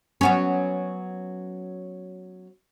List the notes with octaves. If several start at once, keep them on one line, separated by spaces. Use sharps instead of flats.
F#3 B3 C#4